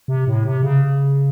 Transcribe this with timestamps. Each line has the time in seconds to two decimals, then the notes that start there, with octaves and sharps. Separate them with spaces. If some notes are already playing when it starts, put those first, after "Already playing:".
0.08 C3
0.27 A2
0.45 C3
0.63 C#3